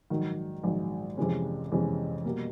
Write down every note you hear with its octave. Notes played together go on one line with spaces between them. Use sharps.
A#1 G#2 D#3 F#3
A#1 G#2 D#3 F#3
F2 C3 E3 G#3 C#4
F2 C3 E3 G#3 C#4
B2 G3 A#3